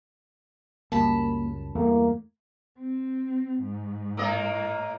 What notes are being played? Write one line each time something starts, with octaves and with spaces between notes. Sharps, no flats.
C#2 F#2 G3 A#3 A5 B5
E2 G2 E3 A3 A#3
C4
G#2
A2 A#3 D#5